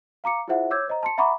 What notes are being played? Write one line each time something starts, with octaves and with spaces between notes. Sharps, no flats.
F5 A#5 D6 C#7
E4 F4 G#4 C5 E5 F#5
C#5 D6 E6 G6 G#6
C5 D#5 A#5
A5 C6 C#7
E5 F#5 A#5 B5 C#6 D6